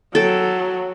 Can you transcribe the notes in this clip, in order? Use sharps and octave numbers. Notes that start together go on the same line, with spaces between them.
F#3 A4 G5